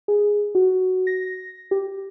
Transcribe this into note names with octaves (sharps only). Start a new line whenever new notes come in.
G#4
F#4
A#6
G4